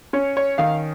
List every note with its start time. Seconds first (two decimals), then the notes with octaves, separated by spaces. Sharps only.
0.13 C#4 C#5
0.37 C#5
0.58 D#3 F5